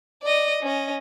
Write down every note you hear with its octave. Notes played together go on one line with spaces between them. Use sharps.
D5 D#5
C#4 D#5